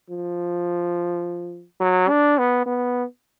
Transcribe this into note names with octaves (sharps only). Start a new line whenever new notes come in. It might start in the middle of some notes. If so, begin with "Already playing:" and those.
F3
F#3
D4
B3
B3